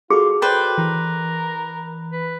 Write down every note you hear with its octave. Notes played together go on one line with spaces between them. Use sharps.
F4 F#4 G#4 A4
B4 C5 D5 G5
E3 A#4
B4